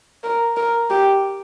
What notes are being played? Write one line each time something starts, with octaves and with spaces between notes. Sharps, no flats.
A#4
A#4
G4